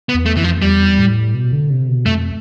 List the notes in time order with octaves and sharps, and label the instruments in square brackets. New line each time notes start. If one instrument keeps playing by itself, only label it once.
[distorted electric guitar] B3
[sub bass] E2
[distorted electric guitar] A3
[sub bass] F2 [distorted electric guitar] E3
[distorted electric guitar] F3
[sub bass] E2 [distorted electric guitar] G3
[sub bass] A2
B2
D3
C3
B2
[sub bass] F2 [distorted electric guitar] A3